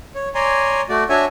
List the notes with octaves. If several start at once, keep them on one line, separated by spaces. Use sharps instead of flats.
C#5
C#5 D5 G#5 A#5 C6
A3 F#4 D5
D4 F#4 C#5 E5 G#5